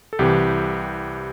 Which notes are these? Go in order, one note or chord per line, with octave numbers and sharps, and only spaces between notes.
A4
C2 C3 E3 G4